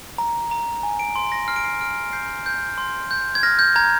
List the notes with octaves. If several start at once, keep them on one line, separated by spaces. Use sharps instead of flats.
A#5
A#5
G#5
D7
C6 D7
A#6
F6 C7
D7
C7
F6 D7
G6 C7
G6
C6
G6
G#6
F6 A#6
G6
A#5 G#6